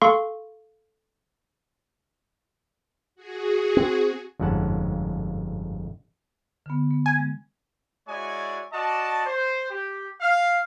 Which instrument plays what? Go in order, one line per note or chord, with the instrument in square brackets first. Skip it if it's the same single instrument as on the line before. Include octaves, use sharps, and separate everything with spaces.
[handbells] A4 F5 C6 C#6
[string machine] F#4 G#4
[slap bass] C4
[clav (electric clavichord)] G1 F2 G#2 C#4 F#5 A5
[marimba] D3 B3
B3
[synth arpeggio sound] G#5
[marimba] G#3
[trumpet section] G#3 E4 F#4 C#5 D5 G#5
F#4 D5 D#5 A5
C5
G4
F5